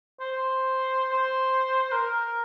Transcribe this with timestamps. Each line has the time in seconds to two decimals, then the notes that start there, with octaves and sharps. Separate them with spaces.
0.20 C5
0.33 C5
1.13 C5
1.92 A#4